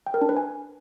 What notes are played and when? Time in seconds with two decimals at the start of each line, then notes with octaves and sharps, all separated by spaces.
0.06 G5
0.14 A#4
0.22 D4
0.29 B4
0.37 G#5